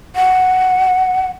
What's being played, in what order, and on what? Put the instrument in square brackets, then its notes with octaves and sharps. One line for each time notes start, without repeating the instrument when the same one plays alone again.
[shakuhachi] F#5